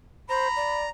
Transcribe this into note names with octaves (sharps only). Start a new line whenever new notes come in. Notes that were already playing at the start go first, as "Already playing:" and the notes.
C5 A#5 B5
D5